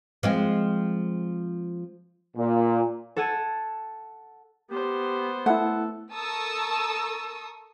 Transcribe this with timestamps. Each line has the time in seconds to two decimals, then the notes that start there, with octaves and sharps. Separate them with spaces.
0.23 F3 G#3 C4
2.37 A#2
3.16 A4 F#5 A5 G#6 D#7
4.71 B3 G4 C5
5.46 A3 E4 A4 F#5
6.14 A4 A#4 A5 C#6 D#6 E6